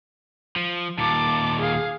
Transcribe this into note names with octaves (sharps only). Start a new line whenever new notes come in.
F3
D#2 A#2 A5 D6
G#4 F5